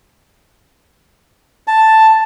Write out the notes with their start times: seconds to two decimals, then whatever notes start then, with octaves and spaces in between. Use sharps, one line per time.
1.68 A5